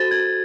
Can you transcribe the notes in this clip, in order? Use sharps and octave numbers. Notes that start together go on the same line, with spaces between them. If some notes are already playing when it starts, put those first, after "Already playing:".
Already playing: F#4 A4 C5 A6
G#6